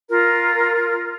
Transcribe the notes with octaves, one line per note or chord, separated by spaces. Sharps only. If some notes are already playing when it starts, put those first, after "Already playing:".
F4 A#4